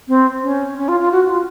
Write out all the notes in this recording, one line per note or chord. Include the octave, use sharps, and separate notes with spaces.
C4
C#4
C#4
F4
F4
F#4
F4